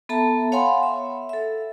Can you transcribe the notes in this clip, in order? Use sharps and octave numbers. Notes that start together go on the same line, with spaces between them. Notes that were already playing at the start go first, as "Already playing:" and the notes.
B3 A4 E5 A5 A#5
C#5 F5 F#5 G#5 B5 C6
E5
A4 E5